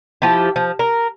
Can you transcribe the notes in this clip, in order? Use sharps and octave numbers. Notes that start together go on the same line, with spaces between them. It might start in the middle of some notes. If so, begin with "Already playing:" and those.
F3 E4 G4
F3
A#4